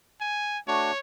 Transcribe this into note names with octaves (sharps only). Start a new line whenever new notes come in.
G#5
A3 D4 F#4 C#5